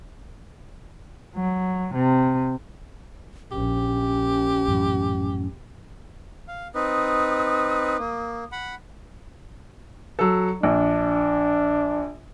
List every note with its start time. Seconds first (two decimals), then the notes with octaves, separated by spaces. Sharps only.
1.35 F#3
1.94 C3
3.51 A#1 C#4 G4
4.68 F#2 A2 E3
6.48 F5
6.75 C4 D#4 B4 D#6
7.99 A#3
8.52 F#5 B5
10.19 F#3 A4
10.63 A#1 D4